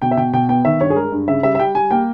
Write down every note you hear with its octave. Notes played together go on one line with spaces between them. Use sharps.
B2 G5
E5
B2 G5
B2 G5
B3 G5
D#3 E5
G2 C#5
G#4
G#3 A#4
G2
C#3 E5
G3 E5
E5
G3 G5
G3 G#5
A#3 G5